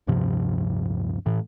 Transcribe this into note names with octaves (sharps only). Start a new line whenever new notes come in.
D1 G2 C3 F3
A2 E3